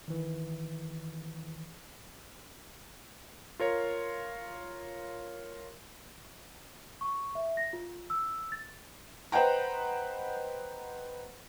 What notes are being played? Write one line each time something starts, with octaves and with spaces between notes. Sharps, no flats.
D#3 E3
F4 A#4 C#5
C#6
E5
A#6
F4
E6
A6
B4 C5 D#5 F#5 G5 A#5